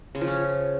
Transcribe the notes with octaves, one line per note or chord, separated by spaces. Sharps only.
C#3
F3
C#4